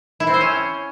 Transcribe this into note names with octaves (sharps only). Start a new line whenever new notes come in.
E4
C4
C5
C#4